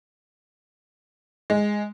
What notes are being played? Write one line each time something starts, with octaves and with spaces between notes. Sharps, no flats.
G#3